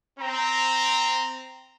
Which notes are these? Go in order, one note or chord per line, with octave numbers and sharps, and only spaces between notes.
C4 A#5